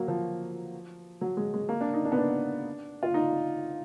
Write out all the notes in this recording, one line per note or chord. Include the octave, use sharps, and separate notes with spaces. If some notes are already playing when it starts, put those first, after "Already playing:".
Already playing: F#3 A#3
F3
F#3
G#3
G#3
A#3
D4
D#4
D4
B3
D4
F4
D#4